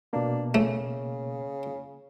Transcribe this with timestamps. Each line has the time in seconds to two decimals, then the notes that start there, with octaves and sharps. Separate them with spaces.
0.13 B2 A#3 D4
0.54 C#3 A3